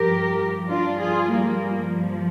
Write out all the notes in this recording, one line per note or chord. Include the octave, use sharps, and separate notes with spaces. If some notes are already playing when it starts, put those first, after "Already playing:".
Already playing: G2 F3 G4 A#4
D4 F4
F4 G#4
G3 A#3
F3